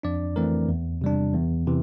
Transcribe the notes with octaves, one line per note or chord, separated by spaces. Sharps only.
F2 D4 D5
E3 A3 C4 A#4
E2
C3 G3 D4
E2
C3 E3